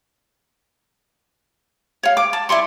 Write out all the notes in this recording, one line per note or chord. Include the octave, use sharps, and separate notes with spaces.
C#5 F5
D6
A5
E4 D5 C6 C#6